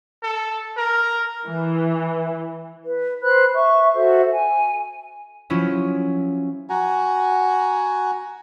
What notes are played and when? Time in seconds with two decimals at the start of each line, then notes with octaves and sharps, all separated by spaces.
0.23 A4
0.77 A#4
1.47 E3
2.84 B4
3.22 B4 C5 B5 F#6
3.54 E5 C#6
3.94 F#4 A4 C5 E5
4.32 G#5
5.50 F3 F#3 C#4 E4 F4
6.70 F#4 F#5 G#5 A#5